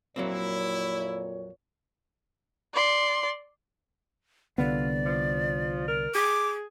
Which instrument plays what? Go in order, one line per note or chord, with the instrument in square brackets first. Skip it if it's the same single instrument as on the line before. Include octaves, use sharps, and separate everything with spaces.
[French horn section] F2 A#2 C#5 [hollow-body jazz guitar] F#3 A#3 C4 [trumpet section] E4
[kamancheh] D5 C6
[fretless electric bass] C2 D3 B3 [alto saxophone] F4 [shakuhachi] D5
[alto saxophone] F3
A#4
[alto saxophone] G#4 [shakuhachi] D6